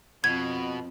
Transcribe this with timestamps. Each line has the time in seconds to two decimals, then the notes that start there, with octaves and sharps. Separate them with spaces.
0.24 F2 B2 G#6